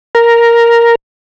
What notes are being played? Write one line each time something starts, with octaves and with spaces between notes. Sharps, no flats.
A#4